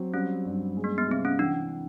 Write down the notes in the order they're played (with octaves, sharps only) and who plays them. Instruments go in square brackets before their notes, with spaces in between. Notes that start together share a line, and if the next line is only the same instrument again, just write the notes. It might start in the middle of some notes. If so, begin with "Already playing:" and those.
Already playing: [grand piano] F#3 C4
[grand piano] G3 [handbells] C#4
[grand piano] G2
G#3
[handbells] A#3
B3
[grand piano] C3 [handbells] C4
[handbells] C#4
[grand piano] E3 [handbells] D4